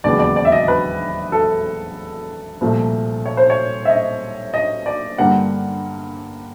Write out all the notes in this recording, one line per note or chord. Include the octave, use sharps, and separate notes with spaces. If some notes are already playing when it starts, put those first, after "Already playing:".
E1 D#2 C#3 F#3 B3 D5
D5
D5
E5
D#5
B4
A4
C2 A#2 F3 A3
C#5
C5
C#5
E5
D#5
D#5
D5
G2 D3 G3 A#3 D4 F#5